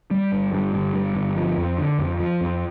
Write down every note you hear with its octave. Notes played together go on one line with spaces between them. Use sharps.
G3
G1
G2
G1
G3
G1
F3
F2
D3
F2
F3
F2